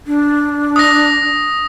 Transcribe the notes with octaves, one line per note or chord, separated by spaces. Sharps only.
D4
D#6 A#6